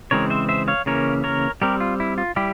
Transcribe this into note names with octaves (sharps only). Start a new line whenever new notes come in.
C#3 E3 G#3 C4 A#4 C#5
C5 E5
C5 E5
C#5 F5
C#3 E3 A#3 C#4 A#4 C#5
A#4 C#5
G3 C4 G4 A#4
F4
E4
F4
G3 E4 G4